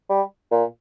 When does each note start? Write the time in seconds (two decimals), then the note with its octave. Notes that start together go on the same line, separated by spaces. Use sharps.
0.09 G3
0.51 A#2